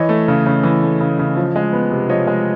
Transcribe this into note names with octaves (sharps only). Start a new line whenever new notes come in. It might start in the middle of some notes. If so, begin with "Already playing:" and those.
Already playing: E3 C#5 D#5
A3
C#3
C#3
E3
A3
C#3
C#3
F3
G#3
B3
C3
F3 C#5 D#5
G#3